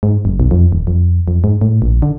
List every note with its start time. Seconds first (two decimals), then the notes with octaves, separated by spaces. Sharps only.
0.03 G#2
0.25 F#1
0.40 B1
0.51 F2
0.72 D#1
0.87 F2
1.28 F2
1.44 G#2
1.61 A2
1.82 A#1
2.02 D3